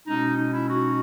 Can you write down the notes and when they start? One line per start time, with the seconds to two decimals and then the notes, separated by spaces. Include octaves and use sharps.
0.06 B2 G#3 C#4 D#4
0.36 D#4
0.52 E4
0.67 D#4 F#4